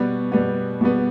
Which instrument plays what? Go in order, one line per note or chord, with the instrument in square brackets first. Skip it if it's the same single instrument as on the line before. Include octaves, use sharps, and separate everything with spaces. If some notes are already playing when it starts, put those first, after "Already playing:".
Already playing: [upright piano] B2 G3 B3 B4
B2 G3 B3
B2 G3 B3